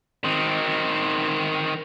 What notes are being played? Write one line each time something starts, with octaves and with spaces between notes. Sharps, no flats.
D#3 C4